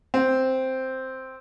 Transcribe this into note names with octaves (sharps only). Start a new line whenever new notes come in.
C4